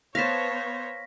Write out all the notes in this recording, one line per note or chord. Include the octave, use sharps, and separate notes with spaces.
B3 C5 C#5 F5 A5 A#6 B6